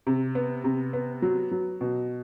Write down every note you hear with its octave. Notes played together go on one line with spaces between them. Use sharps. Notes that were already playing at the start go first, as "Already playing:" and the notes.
C3
B3
C3
B3
F#3
F#3
B2